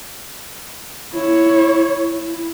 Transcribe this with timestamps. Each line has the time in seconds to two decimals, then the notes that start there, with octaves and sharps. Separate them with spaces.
1.13 E4 C#5
2.14 E4